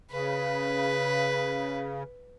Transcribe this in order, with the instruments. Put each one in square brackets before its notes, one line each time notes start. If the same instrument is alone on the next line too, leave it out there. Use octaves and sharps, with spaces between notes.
[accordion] C#3 [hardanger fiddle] B4